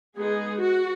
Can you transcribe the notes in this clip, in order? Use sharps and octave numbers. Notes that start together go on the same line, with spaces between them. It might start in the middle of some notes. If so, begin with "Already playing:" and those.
G#3 B3 D#4 G#4
F#4